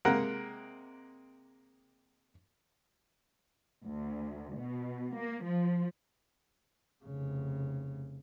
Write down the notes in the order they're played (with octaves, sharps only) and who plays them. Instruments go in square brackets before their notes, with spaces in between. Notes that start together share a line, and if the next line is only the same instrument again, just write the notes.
[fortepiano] C3 G#3 A#3 A#4 F#5
[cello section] D2
B2
A#3
F3
[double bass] F1 C#3